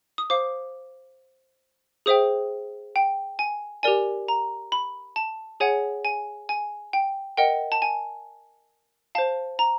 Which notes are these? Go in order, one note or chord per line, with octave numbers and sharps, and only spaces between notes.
D#6
C5 F5 D6
G#4 C5 E5 G5 D#6
G5
G#5
G4 A#4 D5 G#5
A#5
B5
A5
G#4 C#5 F#5 G#5
G#5
G#5
G5
A#4 D#5 F#5 G5
A5
G#5
C5 F5 A5
A#5